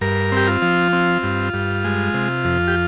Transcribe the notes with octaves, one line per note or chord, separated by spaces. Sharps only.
G2 A#4
C4 G4
F4
F3
C4
G2
G2
G#3
C3
F2
G4